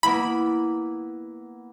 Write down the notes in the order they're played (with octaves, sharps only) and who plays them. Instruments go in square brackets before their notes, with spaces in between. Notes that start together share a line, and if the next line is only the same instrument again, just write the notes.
[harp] A#3 B3 E4 [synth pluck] B5